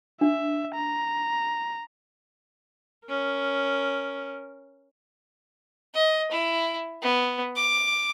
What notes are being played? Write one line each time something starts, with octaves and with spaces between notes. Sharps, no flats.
D4 E5
A#5
C#4 A#4
D#5
E4
B3
D6